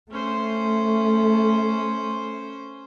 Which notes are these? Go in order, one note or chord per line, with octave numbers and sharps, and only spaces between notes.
A3 C#4 C5